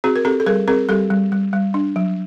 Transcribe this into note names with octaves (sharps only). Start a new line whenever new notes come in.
C4 F#4 G#4
A#4
C4 G4 A4
A4
G3 G#4 A#4
C4 G#4 A#4
G3 G4 A4
G3
G3
G3
D4
F#3